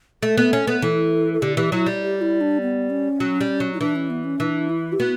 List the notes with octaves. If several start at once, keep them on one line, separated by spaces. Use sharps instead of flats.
A3 A4
B3
C#4
B3
E3 A4
A4
D3 G4
E3 G4
F#3 E4
G3
G4
E4
D4
B3
C#4
F#3
G3
F#3
E4
E3 D4
C#4
B3
C#4
E3 D4
E4
G4
B3 F#4